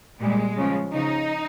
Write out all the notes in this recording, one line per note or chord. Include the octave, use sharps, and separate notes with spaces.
A#2 G3 G#3
C#3 F3
C#3 F3 D#4